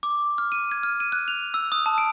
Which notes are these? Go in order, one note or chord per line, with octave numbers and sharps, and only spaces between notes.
D6
F6
D#7
G#6
F6
D#7
F#6
F7
E6
D#6
A5
D7